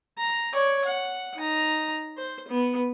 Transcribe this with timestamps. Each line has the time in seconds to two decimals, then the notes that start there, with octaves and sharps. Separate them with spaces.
0.18 A#5
0.54 C#5 D5
0.85 F#5
1.36 D#4 A#5
2.17 C5
2.48 B3